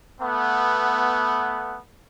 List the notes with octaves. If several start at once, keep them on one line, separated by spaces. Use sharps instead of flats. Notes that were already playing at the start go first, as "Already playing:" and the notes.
A3 B3